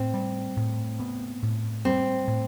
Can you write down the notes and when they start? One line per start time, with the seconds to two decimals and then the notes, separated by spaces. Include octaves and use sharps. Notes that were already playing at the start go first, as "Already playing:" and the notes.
Already playing: A2 C4
0.14 G3
0.57 A2
1.00 B3
1.42 A2
1.85 G3 C4
2.27 A2